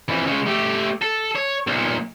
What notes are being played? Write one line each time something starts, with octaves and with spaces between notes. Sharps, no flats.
F2 E3
C#3 G#3
A3 G4
A4
C#5
B1 A#2